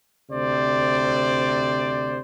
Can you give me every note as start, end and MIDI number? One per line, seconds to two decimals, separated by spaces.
0.31 2.21 38
0.31 2.21 48
0.31 2.21 72
0.31 2.21 74